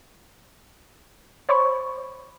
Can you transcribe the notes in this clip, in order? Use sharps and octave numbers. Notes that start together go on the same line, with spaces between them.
C5 C#5 B5 C#6